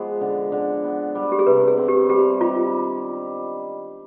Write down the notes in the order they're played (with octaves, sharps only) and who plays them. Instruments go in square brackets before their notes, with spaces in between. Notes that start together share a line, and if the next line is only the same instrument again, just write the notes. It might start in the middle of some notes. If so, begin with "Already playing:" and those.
Already playing: [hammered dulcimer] F3 G#3 B3 [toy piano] G#4
[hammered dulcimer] D3
D3
B3
G3
[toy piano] G4
G#4
[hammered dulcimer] C3 [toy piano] B4
[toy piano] G#4
[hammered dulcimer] C4
[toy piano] G4
[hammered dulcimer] G3 [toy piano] G4
[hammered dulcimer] D#3 [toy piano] F4